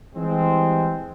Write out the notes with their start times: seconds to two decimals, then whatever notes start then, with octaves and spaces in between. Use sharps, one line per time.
0.16 E3 G3 G#3 C4